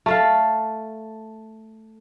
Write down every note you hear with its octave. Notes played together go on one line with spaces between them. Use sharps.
A3 A4 F5